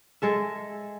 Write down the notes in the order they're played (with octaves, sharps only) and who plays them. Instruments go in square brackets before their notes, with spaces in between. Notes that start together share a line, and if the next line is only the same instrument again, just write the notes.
[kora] G#3 A4 E5